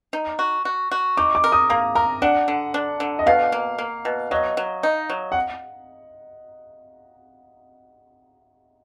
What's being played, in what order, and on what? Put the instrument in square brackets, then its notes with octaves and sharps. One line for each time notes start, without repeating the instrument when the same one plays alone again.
[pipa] D#4
F#4
F#4
F#4
[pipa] D#4 [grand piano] D6
[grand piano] D6
[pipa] A#4
[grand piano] D#6
[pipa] A#3 [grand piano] A#5
[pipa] A#4 [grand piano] A#5
[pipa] D4 [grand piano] F#5
[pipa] D3
D4
D3
[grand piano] D#5
[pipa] B2 [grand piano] F5
[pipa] A#3
A#3
B2
[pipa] F#3 [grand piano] D#5
[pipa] F#3
D#4
F#3
[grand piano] F#5